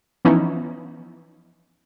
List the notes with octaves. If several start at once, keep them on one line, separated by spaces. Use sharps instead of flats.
E3 F3 B3 C#4 D#4 E4